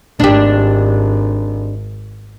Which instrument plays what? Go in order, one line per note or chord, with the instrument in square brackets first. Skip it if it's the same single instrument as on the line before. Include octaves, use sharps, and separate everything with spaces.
[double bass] G#1 [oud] D4 G4